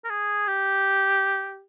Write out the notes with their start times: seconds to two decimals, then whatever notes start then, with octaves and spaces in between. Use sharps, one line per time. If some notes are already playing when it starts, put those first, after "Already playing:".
0.04 A#4
0.10 G#4
0.47 G4